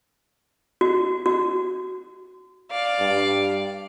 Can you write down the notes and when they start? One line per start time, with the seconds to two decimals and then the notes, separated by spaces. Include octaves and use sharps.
0.81 F#4
1.26 F#4
2.70 D5 F5
3.00 G2